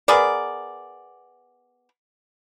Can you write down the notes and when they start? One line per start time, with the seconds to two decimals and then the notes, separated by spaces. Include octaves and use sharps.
0.08 B3 G#4 A#4 D5